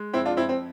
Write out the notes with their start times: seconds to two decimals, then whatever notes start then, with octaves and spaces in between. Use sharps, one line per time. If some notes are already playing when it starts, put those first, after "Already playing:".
Already playing: G#3
0.14 F2 C4 E4
0.25 D4 F4
0.37 F2 C4 E4
0.49 C4